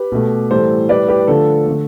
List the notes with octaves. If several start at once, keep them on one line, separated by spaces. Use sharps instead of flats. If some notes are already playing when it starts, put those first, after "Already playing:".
Already playing: G4 B4
B2 A3
A2 E3 G3 A4 C5
A2 G3 B4 D5
G4 B4
D3 F3 A3 A4
D3 A3